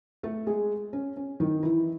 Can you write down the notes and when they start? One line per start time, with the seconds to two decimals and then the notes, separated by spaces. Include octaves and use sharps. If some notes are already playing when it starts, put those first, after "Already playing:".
0.23 A3 A4
0.47 G#3 G#4
0.93 C#4
1.16 C#4
1.40 D#3 D#4
1.63 E3 E4